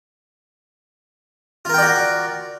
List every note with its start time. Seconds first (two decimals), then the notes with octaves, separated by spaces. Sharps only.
1.65 F4
1.69 A#4
1.74 G5
1.78 D5
1.82 F#4